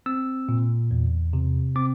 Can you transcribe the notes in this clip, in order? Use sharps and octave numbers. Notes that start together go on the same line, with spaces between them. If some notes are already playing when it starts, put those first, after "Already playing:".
C4 E6
A#2
E2
C3
C4 D6